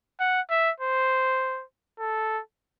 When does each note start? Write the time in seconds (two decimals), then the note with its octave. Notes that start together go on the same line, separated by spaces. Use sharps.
0.20 F#5
0.50 E5
0.80 C5
1.99 A4